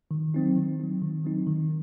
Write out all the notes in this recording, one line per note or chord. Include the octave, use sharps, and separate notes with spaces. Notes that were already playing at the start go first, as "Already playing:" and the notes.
D#3
F#3 C4 D#4
D#3
F#3 C4 D#4
D#3
F#3 C4 D#4
D#3